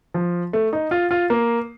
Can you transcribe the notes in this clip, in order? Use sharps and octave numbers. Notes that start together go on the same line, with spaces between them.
F3
A3
D#4
F4
F4
A#3